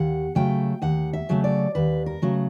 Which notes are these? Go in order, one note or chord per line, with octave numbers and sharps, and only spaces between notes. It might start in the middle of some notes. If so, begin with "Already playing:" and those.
Already playing: D#2 F#5
C#3 F#3 A3 G5
D#2 F#5
E5
C#3 F#3 A3
D5
D#2 B4
A#4
C#3 F#3 A3